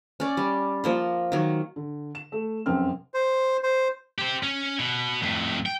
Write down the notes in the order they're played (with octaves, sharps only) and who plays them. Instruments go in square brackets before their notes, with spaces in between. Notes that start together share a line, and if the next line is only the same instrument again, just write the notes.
[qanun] C#4 D5
G3
F3 A#3 C6
D#3 F#3
[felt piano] D3
E7
A3
F1 F#2 C4 F6
[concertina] C5
C5
[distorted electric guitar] G4 C5
C#4
B2
F2 A2
G5